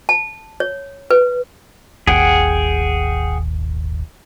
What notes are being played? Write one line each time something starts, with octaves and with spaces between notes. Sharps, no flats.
A5
C#5
B4
D#1 G#1 D#2 G#4 F#5 G5